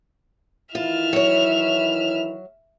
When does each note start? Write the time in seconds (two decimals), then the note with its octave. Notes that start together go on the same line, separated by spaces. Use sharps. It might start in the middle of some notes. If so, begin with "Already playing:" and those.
0.75 D#3 E3 E4 F4 E5 F6
1.13 F#3 C#5